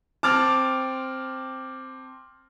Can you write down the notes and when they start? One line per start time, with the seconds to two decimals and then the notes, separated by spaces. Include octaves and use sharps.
0.23 C4 A5 D6 F6 A6